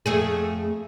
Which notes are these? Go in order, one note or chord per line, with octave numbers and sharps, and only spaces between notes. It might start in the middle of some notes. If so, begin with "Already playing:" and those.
F2 A3 G#4